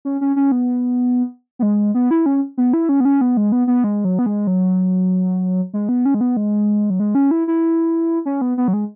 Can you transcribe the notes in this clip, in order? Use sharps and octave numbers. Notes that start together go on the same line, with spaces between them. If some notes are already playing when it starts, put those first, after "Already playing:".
C#4
C#4
C#4
B3
B3
G#3
B3
E4
C#4
B3
E4
C#4
B3
C#4
B3
G#3
B3
B3
G#3
F#3
B3
G#3
F#3
G#3
B3
C#4
G#3
B3
G#3
F#3
G#3
C#4
E4
E4
C#4
B3
B3
F#3
G#3